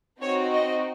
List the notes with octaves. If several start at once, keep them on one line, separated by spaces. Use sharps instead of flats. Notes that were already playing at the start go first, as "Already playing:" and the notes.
C4 D#4 F#4 C#5
D#5